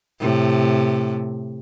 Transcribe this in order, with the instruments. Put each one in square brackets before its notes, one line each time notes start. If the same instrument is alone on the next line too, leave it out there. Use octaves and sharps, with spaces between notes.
[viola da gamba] A2 C3